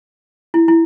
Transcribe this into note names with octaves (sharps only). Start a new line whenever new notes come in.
E4
E4